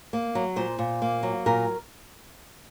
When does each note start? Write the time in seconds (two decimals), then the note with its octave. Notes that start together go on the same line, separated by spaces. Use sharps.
0.13 A#3
0.35 F#3
0.56 A#2 C5
0.79 A#2
1.02 A#3
1.23 F#3
1.46 A#2 A#4